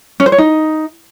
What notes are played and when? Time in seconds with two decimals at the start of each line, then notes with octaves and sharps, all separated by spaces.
0.20 C#4
0.26 C5
0.32 C#5
0.38 D#4